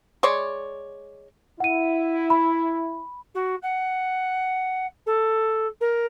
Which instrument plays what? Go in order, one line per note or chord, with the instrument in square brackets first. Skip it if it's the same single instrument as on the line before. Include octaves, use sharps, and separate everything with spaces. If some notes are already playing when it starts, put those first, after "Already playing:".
[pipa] G#3 C#5 D5
[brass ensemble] E4 [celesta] F#5 D#7
[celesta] B5
[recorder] F#4
F#5
A4
A#4